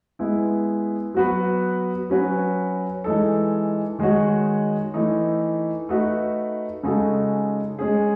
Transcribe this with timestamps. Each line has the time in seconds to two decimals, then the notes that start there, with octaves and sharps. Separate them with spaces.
0.19 G#3 B3 E4
1.14 F#3 B3 F#4 B4
2.10 F#3 C#4 F#4 B4
3.04 E3 G#3 D#4 A4
3.99 D#3 G#3 D#4 F#4 C#5
4.94 E3 A3 D#4
5.89 A3 D#4 F#4 B4
6.83 C#3 G#3 D#4 F#4 A4
7.79 G#3 C#4 G#4